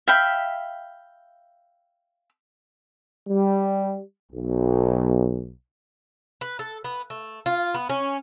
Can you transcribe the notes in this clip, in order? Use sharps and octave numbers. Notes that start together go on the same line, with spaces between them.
E5 F5 G5 B5
G3
B1
B4
A4
B3
A3
F4
B3
C#4